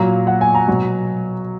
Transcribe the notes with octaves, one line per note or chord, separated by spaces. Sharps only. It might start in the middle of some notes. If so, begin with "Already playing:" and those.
Already playing: A#2 F#3 A#5
F#5
G#5
A#5
B2 F#3